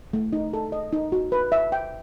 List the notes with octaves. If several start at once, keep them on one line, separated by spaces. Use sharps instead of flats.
A3
D#4
A4
D#5
D#4
F#4
B4
E5
G5